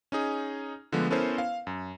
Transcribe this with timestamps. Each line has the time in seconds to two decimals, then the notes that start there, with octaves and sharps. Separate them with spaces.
0.12 C#4 D#4 G#4
0.92 D3 F3 G#3 A3 B3
1.10 B3 C#4 E4 A4 A#4 C5
1.38 F5
1.67 F#2